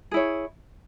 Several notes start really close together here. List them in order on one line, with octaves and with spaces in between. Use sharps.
G#4 E4 C#5